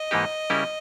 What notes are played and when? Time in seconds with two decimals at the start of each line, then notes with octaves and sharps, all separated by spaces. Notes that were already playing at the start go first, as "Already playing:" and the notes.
Already playing: D#5
0.11 G#2 E3 A#3 D#4 G4
0.50 C#3 G3 C#4 E4 A#4